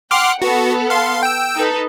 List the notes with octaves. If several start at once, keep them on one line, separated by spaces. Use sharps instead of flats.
F#5 G5 C6 D6 F6
B3 F#4 A4
F5 C6
G5 E6
D#4 A4 B4